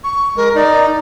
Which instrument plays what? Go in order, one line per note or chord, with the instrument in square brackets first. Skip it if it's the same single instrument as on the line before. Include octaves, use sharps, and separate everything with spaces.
[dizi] C#6
[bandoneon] G#3 [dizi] A#4
[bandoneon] D#4 [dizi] D5